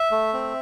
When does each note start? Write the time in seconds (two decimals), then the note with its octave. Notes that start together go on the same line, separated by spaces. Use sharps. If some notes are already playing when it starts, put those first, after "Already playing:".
Already playing: E5
0.11 A3
0.33 C4